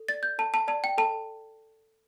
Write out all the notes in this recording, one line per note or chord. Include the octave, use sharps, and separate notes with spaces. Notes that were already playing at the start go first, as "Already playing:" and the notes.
Already playing: A4
D5 A6
G6
A4 A5
A5
D5 A5
G5
A4 A5